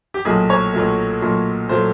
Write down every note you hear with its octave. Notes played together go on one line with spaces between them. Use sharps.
G4
B1 A#2 F#3 A3 G#4
C#5
B1 A#2 F#3 A3
B1 A#2 F#3 A3
A#2 F#3 A3 C5